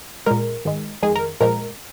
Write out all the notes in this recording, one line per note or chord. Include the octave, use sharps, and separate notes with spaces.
A#2 G#3 A#4
G#2 D#3 G#3
F2 D#3 G#3 G#4
A#4
A#2 F3 G#3 A#4